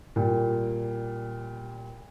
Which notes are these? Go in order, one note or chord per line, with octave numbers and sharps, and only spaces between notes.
A#2 G3